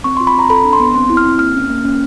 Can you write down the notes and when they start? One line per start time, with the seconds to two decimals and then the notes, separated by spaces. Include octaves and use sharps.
0.04 C4 C#6
0.17 C6
0.20 F4
0.27 B5
0.35 C4 A#5
0.50 A4 B5
0.65 D4
0.73 C6
0.80 B3
0.94 C4 C6
1.10 E4
1.17 F6
1.25 C4
1.39 A#3 F6
1.54 C#4
1.70 A#3
1.84 C#4